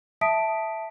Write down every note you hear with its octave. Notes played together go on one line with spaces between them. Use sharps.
E5 A5 D#6 B6 D7